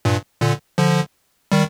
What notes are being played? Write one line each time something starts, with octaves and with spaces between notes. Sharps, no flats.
G2 A#2
A#2 D3
D3 F3
D#3 G3